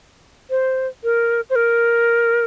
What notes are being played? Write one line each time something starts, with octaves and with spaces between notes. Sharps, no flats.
C5
A#4
C5
A#4